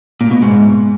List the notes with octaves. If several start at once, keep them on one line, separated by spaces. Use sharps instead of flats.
A#2
B2
G#2